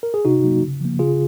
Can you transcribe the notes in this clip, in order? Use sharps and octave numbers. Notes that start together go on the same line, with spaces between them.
A#4
G#4
C3 D#4 F#4
F#3 A#3
C#3
F3 A#3
C#3 F4 G#4